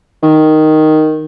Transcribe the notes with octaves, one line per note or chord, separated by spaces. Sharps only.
D#3